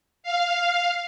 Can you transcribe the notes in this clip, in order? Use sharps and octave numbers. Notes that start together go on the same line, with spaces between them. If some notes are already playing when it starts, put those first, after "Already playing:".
F5